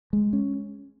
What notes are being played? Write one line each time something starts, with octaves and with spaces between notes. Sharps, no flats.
G#3
C#4